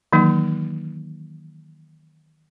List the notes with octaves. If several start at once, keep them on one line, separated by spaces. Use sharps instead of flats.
D#3 E3 F#3 A#3 D#4